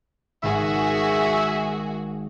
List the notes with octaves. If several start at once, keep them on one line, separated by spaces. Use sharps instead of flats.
G#1 F#4 G#4 E5